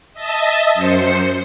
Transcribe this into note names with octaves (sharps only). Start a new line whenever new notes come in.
D#5 E5 A5
F#2 C5 C#7